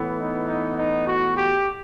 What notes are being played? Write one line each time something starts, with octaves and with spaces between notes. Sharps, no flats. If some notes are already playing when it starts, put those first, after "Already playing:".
Already playing: A2 E3 B3
D#4
D#4
D#4
F#4
G4